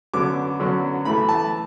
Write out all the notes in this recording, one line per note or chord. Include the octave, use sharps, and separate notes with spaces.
F#2 D3 F#3 B3 D6
F#2 D3 F#3 B3
A2 E3 A3 B5
A5